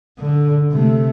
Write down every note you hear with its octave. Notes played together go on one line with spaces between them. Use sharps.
D3
C3 A3